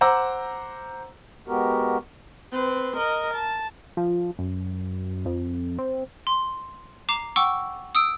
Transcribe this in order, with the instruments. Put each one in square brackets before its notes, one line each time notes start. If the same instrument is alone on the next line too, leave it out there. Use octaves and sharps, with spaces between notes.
[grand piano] C5 F#5 A#5 D6 E6
[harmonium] G#3 B3 F#4 G4 A#4
[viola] C4 B4
A#4 D#5
A5
[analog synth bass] F3
F#2
F2
C4
[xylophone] C6
A#5 D6 C7 E7
F#5 G5 C#6 D6 E6
D#6 E6 D7